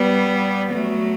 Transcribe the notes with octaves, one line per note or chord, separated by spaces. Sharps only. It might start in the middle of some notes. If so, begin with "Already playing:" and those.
Already playing: G3 B3
F#3 A3